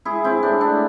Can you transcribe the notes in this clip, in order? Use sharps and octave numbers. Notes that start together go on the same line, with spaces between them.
G#3 E4 G#4
C4 E4
A2 D4
D4